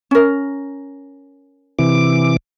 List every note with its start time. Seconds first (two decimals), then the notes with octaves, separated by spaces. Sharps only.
0.11 C#4 A#4
1.79 C3 E3 D6